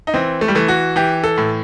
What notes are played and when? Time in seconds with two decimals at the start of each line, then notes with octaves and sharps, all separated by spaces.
0.07 D#4
0.14 E3 C4
0.41 A3
0.48 G3
0.55 E3 A3
0.68 F#4
0.96 E3 G4
1.24 A4
1.38 A2